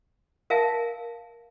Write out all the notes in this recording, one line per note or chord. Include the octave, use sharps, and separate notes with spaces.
A#4 E5 F5 G#5 A5